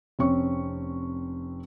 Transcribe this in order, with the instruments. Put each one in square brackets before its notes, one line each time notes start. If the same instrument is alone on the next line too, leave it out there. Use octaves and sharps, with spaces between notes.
[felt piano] F1 C4 C#4 C#6